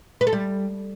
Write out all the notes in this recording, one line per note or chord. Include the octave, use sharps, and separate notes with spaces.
B4
A4
G3